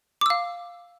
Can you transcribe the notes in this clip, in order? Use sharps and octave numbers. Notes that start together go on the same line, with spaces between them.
F5 D6 E6